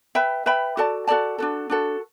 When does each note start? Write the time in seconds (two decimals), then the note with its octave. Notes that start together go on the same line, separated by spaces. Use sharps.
0.15 B4 E5 G5 B5
0.46 B4 E5 G5 B5
0.77 F#4 A4 D5 A5
1.07 F#4 A4 D5 A5
1.38 D4 F#4 A4
1.70 D4 F#4 A4